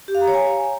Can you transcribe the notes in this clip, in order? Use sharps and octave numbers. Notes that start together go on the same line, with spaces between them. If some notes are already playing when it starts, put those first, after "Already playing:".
G4
F5
A#5
C#5
G#5